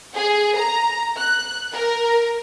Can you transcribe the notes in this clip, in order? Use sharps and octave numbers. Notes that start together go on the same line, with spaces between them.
G#4
A#5
F#6
A#4